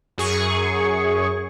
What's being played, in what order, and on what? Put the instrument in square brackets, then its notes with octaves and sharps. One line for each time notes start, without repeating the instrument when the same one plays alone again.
[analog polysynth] F#2 G#4 C#6